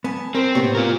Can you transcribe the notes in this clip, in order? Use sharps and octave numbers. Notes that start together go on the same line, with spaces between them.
B3 G#5 A5
C4 A#4 C5
A2 C3 A#3 B3 G4 C#5
F4 A#4